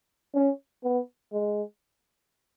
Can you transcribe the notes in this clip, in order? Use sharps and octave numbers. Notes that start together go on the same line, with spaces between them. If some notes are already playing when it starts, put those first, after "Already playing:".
C#4
B3
G#3